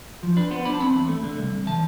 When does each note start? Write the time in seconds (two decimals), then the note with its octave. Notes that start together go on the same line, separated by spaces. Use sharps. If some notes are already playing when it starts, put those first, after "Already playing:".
0.23 F3
0.37 D4 B4
0.51 B3 C5
0.65 D4 B5
0.74 A5
0.80 C4 B5
0.95 E2
1.08 A3
1.23 D3
1.38 C2
1.52 C2
1.66 E3 A5